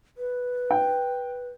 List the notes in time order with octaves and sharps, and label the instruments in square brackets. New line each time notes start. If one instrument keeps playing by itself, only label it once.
[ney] B4
[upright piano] G5